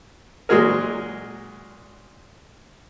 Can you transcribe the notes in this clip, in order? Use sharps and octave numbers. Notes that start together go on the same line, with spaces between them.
A#2 F#3 G#3 F#4 G#4 A#4